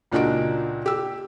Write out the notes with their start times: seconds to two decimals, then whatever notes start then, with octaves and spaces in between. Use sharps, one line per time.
0.11 C#2 A#2 D4 D#4 F#4 D7
0.86 G4 E6